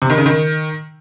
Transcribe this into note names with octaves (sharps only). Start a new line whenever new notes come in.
C3
D#3
C#3
D#3